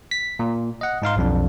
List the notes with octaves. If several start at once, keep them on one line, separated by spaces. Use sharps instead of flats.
B6
A#2
D#5 F#5
G#2 D#4 F5 C6
B1 F2 D4